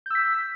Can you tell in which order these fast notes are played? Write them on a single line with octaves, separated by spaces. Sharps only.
G6 E6 B6